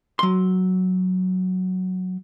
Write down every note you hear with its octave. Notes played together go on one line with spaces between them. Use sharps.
F#3 C6